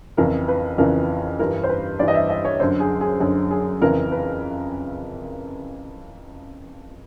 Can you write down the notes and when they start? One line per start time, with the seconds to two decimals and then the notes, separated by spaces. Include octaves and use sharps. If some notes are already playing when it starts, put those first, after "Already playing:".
0.17 F2 C#3 E3 A#4
0.48 B4
0.78 F2 C#3 E3 A#4
1.39 G2 E3 A#4
1.63 C5
1.69 B4
1.99 G2 E3 D5
2.08 D#5
2.14 E5
2.30 D#5
2.45 C#5
2.60 F#2 D3 C5
2.80 G#4
3.01 G#4
3.20 F#2 D3 G#4
3.51 G#4
3.82 F2 C#3 E3 A#4
4.12 B4